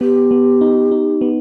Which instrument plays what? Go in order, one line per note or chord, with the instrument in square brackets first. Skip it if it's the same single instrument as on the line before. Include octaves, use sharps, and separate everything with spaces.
[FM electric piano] B3 [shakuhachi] G4
[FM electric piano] B3
D#4
D#4
B3